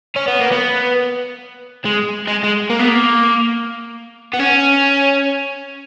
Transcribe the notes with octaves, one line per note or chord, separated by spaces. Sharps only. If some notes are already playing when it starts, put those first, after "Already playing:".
C#4
B3
A#3
B3
G#3
G#3
G#3
A#3
B3
A#3
B3
C#4